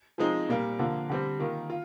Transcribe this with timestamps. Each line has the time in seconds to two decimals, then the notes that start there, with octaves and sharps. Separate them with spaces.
0.18 F3 G#3 C4 D#4
0.48 A#2 G3 A#3
0.79 D3 F3 A#3
1.09 D3 G3 C4
1.39 D#3 A#3 F4
1.70 F4